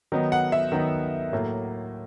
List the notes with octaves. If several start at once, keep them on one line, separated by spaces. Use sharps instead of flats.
D#3 F#3 B3 D#4
F#5
E5
D#3 F#3 B3 D#4
A2 F#3 A#3